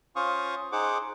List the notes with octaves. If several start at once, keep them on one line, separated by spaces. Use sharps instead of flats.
C#4 F4 C5 F5 C#6 D#6
D#4 G#4 C5 F#5 D6